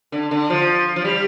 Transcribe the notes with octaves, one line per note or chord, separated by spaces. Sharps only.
D3
D3
F3
F3
G3